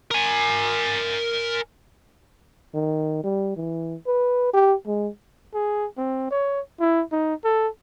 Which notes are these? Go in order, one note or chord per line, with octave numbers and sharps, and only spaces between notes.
A#4 G#5
D#3
G3
E3
B4
G4
G#3
G#4
C4
C#5
E4
D#4
A4